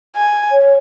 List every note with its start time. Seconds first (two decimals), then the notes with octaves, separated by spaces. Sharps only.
0.16 G#5
0.52 C#5